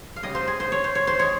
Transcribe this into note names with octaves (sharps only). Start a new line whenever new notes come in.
F5
C#3 G3 D#5
C5
G#4
C5
C#5
C5
C#5
C5
G#3 C#5